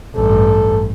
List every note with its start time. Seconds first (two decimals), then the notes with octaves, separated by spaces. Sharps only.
0.16 A1 G2 A4